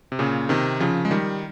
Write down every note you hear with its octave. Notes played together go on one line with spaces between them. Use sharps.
C3
A#2 C#3
C3 D#3
C#3 F3
G#3
D#3 G3